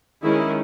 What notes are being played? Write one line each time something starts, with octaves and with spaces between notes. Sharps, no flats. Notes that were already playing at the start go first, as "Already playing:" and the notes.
D#3 G#3 C#4 E4 G#4